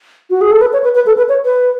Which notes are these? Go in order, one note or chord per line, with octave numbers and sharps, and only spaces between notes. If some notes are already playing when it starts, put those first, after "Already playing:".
F#4
G#4
A4
B4
C#5
B4
B4
A4
B4
C#5
B4